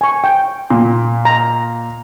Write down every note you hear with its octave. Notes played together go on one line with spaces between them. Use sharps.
G#5 C#6
G5
A#2
A#5